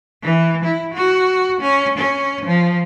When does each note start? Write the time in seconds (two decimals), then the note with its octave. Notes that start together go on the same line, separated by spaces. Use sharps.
0.23 E3
0.64 E4
0.94 F#4
1.61 C#4
1.98 C#4
2.45 F3